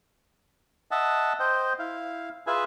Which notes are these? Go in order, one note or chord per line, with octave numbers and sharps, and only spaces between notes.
D#5 E5 F#5 A5
C5 D#5 G5
E4 F5
F4 G#4 B4 E5 G#5